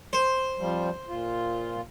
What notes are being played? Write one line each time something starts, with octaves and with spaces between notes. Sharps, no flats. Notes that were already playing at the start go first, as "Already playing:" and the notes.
C5
F2 F3 G3
A#2 F4